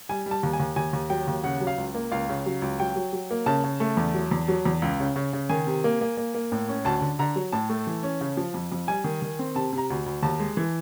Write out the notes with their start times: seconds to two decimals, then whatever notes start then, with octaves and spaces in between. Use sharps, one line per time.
0.09 G3 G#5
0.26 G3
0.31 A5
0.43 D#2
0.53 G#5
0.60 D#2
0.76 D#2 G#5
0.93 D#2
1.10 F#3 G5
1.28 D#2
1.43 C#3 F#5
1.61 F#3
1.67 F5
1.78 C#2
1.95 A#3
2.11 C#2 F5
2.29 C#3
2.46 F#3
2.62 C#2
2.80 F#3 G5
2.96 F#3
3.13 F#3
3.31 A#3
3.46 C#3 A5
3.64 C#3
3.80 A3
3.97 E2
4.14 F#3
4.31 E2
4.48 F#3
4.65 E2
4.82 C#2
5.00 C#3
5.16 C#3
5.33 C#3
5.49 D#3 G#5
5.66 C3
5.84 A#3
6.01 A#3
6.17 A#3
6.35 A#3
6.52 A2
6.68 C#4
6.85 D2 A5
7.01 D3
7.19 D3 A#5
7.36 F#3
7.53 A2 A5
7.69 A3
7.87 E3
8.03 C#4
8.21 C#3
8.37 F3
8.54 F2
8.72 F2
8.87 G3 G#5
9.04 D#3
9.22 D#3
9.39 C4
9.55 C3 A5
9.72 C3
9.78 A#5
9.90 D2
10.06 D2
10.23 D#2 A5
10.40 G#3
10.57 E3